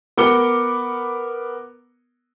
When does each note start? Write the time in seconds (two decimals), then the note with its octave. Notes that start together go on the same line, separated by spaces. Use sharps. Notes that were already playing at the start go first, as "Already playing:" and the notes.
0.17 B3 A#4 D6 C#7 G7